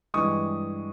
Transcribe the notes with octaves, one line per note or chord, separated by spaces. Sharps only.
G2 E3 G#3 C#6 D#6